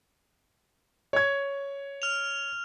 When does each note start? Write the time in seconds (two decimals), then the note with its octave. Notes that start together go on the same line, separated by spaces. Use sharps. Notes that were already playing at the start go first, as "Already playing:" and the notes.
1.13 C#5 G#6
2.02 F6 F7